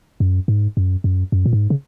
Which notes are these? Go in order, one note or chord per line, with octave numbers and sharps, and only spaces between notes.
F#2
G#2
F#2
F#2
F#2
A#2
G#2
C#3